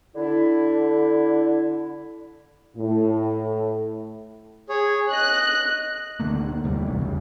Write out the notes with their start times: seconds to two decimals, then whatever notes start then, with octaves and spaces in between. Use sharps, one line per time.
0.16 D3 E4
2.76 A2
4.69 G#4 C#5
5.12 D#5 F#6
6.20 D2 D3 A3 A#3
6.64 D#2 C3 G3
6.86 D1 A1
7.01 E2 C#3